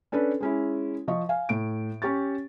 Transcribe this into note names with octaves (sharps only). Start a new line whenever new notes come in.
C#4 D4 A4 B4
G#3 C#4 E4
F3 D#5 C#6
F5 G#5
A2 D7
C#4 G4 C#6 A6